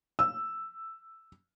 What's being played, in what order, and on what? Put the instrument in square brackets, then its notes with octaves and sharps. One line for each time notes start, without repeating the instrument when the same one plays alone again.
[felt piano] E6